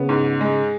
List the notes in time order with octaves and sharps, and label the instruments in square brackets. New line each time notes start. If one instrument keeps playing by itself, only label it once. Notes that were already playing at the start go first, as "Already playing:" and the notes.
Already playing: [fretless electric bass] C#3 [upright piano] B3
[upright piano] G#2
G#3